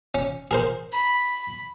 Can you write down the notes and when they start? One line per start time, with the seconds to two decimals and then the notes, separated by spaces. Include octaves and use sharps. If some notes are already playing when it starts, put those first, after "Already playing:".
0.15 C#4
0.51 G#4 A#4 C5
0.92 B5